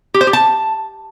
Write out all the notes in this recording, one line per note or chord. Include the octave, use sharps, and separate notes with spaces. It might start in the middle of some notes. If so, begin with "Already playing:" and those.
G4
C5
G4
A5